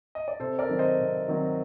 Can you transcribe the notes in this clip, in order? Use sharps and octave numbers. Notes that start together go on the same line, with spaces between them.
D#5
D5
C3 A4 C5
A#4 D5
D#3 F#3 C4
C5 D#5
C3
D#3 F#3 C4